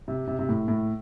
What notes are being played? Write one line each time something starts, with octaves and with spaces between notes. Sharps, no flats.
C3
C3
C3
A2
A2